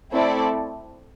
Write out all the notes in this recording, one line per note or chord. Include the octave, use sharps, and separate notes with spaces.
A3 C4 E4 A4 D5